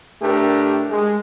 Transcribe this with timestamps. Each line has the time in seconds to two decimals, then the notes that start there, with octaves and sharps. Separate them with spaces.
0.22 A2 A3 D4 G4 A#4
0.91 G#3